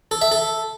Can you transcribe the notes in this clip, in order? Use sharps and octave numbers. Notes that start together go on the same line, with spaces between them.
A4
E5
A4